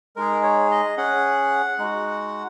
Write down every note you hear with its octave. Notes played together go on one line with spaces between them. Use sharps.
G#3 D#4 G#4 A#4
C#5
D#5
C#4 G#4 F#5
G#3 D#4 F#4